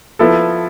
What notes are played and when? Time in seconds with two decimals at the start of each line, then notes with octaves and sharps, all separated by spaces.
0.19 F3 B3 E4 A4